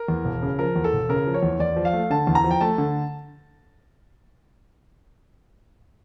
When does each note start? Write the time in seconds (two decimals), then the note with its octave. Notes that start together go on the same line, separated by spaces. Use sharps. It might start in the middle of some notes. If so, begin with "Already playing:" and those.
Already playing: A#4
0.08 E2
0.25 E1
0.42 C#3
0.59 F3 A#4
0.76 E2
0.84 A4
0.93 E1
1.09 C#3 A#4
1.26 F3
1.34 C#5
1.43 E2
1.60 E2 D5
1.76 F3
1.85 F5
1.93 A3
2.10 D3 A5
2.27 E2
2.35 A#5
2.44 F3
2.51 G5
2.61 A3 A5
2.78 D3